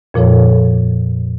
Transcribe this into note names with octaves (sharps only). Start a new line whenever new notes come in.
F2 A#2 F3 A4 C#5